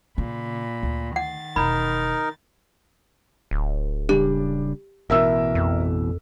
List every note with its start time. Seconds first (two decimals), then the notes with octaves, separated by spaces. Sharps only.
0.18 A#2 C#3 B5
0.83 D2
1.16 D#3 F#5 A6
1.56 E1 D#4 A#4 B5
3.51 D1
4.09 C#3 G3 D4 G4
5.10 A1 B2 E3 A#4 E5 E6
5.55 F2